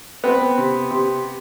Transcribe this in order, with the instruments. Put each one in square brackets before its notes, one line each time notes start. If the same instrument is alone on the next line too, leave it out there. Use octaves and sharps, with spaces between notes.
[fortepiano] B3 C4 B4
C3
C3